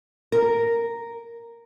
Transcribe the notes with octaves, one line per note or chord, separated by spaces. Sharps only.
A#4